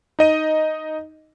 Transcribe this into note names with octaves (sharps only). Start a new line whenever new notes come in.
D#4 D#5 D#7